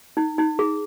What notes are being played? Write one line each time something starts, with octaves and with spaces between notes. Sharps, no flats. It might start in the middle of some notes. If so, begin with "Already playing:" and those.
D#4
D#4
G#4